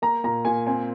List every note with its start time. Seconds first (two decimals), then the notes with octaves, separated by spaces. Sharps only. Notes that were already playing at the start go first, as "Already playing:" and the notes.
0.02 A#3 A#5
0.24 A#2 A#5
0.45 A#2 G#5
0.67 C4 G#5